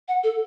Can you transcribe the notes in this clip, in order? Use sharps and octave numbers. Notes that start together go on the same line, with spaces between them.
F#5
A4